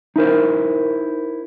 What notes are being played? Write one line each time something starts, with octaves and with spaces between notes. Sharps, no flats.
D#4 E4 A#4 C5